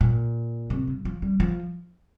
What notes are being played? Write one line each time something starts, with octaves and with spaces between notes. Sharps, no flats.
A#2
C3
G2
F3
G3
F3